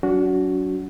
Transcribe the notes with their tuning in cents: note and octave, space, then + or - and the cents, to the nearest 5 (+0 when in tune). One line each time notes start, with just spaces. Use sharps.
F#3 +15 D4 -45 F#4 +0